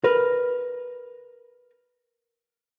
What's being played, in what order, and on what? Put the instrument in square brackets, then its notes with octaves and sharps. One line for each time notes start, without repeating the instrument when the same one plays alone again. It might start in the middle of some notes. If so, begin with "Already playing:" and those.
[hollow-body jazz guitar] A#4 B4